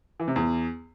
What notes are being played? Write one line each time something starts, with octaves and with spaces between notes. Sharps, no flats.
E3
C3
E2